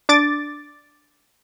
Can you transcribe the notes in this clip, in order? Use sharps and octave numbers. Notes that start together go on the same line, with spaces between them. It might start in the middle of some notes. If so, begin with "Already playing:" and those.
D4 D6 A6